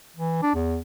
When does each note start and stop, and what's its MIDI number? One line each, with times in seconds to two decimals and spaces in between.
0.16 0.42 52
0.42 0.51 62
0.55 0.78 40